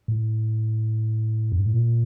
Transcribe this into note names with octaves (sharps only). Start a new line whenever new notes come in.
A2
F2
G2
A2
A#2